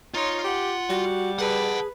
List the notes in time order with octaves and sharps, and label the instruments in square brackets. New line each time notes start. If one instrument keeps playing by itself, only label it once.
[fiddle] D#4 C#5 [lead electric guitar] F4 C6
[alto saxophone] G4 [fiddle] F#5
[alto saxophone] G3 [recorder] F#4
[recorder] G#4 [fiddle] B4 [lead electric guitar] F#5 A5